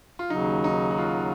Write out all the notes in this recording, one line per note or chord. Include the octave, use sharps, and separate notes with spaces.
F4
D#2 C#3 F#3 D#4
D#4
F#4
F4